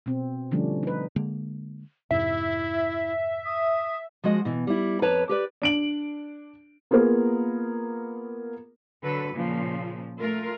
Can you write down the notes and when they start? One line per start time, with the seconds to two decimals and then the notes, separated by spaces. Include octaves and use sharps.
0.06 B2 C4
0.51 D3 F3 G3 A3 C#4 D4
0.83 D#4 B4
1.16 D3 G#3 A#3
2.11 F2 G#2 C3 E4 E5
3.45 D#6
4.24 F3 G#3 F#4 D#5
4.45 B2 E3
4.67 G3 E4
5.02 F2 B4 C#5 A5 A#5
5.29 G4 B4 D5
5.62 D4 D7 F#7
6.91 A#3 B3 F4 G#4 A#4
9.03 D3 F#3 A4 B4
9.33 A#2 C#3 F3
10.20 A3 F4 A#4